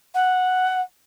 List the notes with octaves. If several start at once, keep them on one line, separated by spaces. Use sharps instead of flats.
F#5